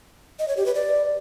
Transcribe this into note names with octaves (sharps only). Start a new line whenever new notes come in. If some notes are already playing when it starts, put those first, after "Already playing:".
D#5
C#5
G4
B4
D5